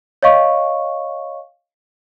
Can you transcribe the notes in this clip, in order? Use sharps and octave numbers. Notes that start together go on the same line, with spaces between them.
C#5 D#5 F5 C#6